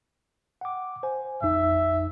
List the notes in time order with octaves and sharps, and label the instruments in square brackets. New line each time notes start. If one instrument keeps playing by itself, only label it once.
[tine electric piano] F#5 G5 D6
C5 G#5
[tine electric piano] A1 F2 D#4 [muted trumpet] E5